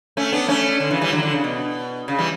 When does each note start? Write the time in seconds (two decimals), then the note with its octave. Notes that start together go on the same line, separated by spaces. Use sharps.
0.17 A3 C#4
0.32 B3 D4
0.48 A3 C#4
0.80 D3
0.91 C#3 E3
1.01 E3 G3
1.12 D3 F#3
1.23 D3
1.33 C#3
1.44 B2
2.08 C#3
2.18 E3 G3